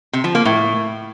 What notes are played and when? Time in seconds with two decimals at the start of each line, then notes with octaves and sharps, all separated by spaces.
0.13 C3
0.24 F3
0.35 A#3
0.45 A2